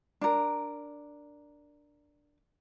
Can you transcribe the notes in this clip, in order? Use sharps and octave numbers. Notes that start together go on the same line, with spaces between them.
D4 A#4